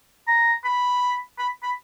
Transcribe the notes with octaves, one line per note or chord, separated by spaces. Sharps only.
A#5
B5
B5
B5